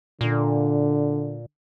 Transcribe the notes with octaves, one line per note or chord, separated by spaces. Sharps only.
A#2 D3